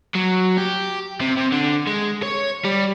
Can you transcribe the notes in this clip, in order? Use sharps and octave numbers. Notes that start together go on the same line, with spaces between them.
F#3
G4
C3
C3
D3
G#3
C#5
G3